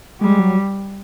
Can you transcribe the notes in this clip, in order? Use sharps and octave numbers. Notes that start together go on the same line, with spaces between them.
G3 G#3
F#3